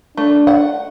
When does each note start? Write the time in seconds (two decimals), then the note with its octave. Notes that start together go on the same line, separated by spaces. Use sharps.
0.17 A3 D4
0.47 F#5